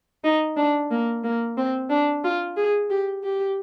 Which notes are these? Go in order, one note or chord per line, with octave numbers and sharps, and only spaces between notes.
D#4
D4
A#3
A#3
C4
D4
F4
G#4
G4
G4